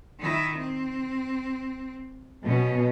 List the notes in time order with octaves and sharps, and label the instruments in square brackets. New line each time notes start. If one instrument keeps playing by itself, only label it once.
[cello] D#3 E4
C4
[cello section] B2 [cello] F#3 C#4